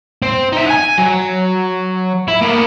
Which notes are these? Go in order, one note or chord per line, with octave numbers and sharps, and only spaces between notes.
C4
D#4 E5
F#5 G#5
F#3
E4
A#3 B3